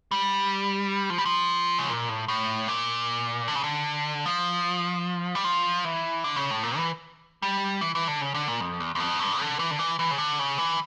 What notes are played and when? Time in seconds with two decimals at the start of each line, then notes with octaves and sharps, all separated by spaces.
0.11 G3
1.10 F3
1.18 G3
1.25 F3
1.79 C#3
1.90 A#2
2.09 A2
2.28 A2
2.68 A#2
3.48 D3
3.55 C#3
3.63 D3
4.26 F3
5.35 G3
5.44 F3
5.85 E3
6.24 D3
6.36 C#3
6.51 A2
6.63 A#2
6.77 E3
7.42 G3
7.81 E3
7.95 E3
8.08 D3
8.21 C#3
8.34 D3
8.48 A#2
8.60 F2
8.80 E2
8.95 E2
9.00 F2
9.20 G2
9.40 D3
9.59 E3
9.71 D3
9.79 E3
9.99 E3
10.11 C#3
10.18 D3
10.39 C#3
10.58 E3